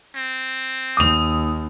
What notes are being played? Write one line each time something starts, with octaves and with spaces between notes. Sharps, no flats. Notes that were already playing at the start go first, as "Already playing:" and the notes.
C4
D#2 D#6 F7